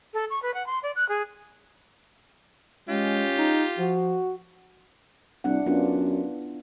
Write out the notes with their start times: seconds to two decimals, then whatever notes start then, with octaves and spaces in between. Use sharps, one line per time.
0.14 A4
0.30 C#6
0.42 B4
0.54 F#5
0.66 C6
0.83 D5
0.96 F#6
1.09 G#4
2.89 G#3 C#4 F4 G4
3.38 D#4
3.79 F3 F#4
5.44 C2 D4 E4 F#5
5.66 F#2 B3 D4 F4